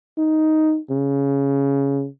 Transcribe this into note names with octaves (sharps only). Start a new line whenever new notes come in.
D#4
C#3